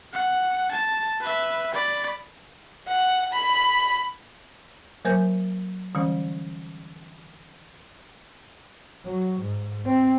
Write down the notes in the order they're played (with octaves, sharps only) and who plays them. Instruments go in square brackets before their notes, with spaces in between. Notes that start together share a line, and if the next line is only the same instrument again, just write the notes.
[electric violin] F#5
A5
B4 E5
D5 B5
[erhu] F#5
B5
[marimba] F#3 A#3 A#4 C5 G#5 G6
D3 E3 G3 C#4
[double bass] F#3
G#2
C4